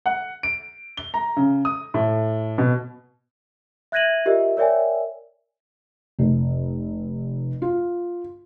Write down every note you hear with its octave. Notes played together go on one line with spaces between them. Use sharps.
F#5
D7
G7
A#5
C#3
D#6
A2
B2
E5 F#6 G#6 A#6 D#7 F#7
F4 G4 A#4 D#5 E5
A#4 C#5 D5 E5 G5 G#5
F1
F4